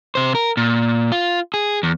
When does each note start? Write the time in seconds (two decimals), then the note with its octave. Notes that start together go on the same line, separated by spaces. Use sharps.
0.15 C3 C5
0.35 A#4
0.57 A#2
1.12 F4
1.54 G#4
1.83 E2